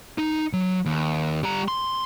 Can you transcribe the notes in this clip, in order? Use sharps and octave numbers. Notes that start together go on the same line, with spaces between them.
D#4
F#3
D#2
G3 A#5
C6